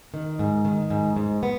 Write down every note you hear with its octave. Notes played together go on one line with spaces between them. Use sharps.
D#3
G#2
D#3
G#2
G#2
B3